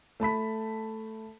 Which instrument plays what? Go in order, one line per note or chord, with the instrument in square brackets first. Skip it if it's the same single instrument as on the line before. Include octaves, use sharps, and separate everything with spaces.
[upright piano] A3 A5 B5 B6